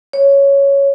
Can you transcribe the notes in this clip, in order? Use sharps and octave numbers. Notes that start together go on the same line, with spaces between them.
C#5